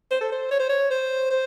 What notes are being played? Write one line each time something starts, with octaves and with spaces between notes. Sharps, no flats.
C5
A4
C5
C#5
C5
C#5
C5
C5